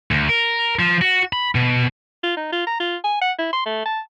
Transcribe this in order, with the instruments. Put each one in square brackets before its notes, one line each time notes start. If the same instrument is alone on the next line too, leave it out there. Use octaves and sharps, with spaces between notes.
[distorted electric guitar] D2
A#4
F3
F#4
B5
B2
[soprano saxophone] F4
D#4
F4
A#5
F4
G#5
F#5
E4
C6
A3
A5